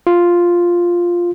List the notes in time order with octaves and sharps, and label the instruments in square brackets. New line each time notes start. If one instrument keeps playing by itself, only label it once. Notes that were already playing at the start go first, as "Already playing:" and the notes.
[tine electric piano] F4